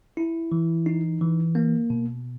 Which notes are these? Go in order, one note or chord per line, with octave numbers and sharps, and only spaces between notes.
E4
E3
D#4
E3
A#3
B2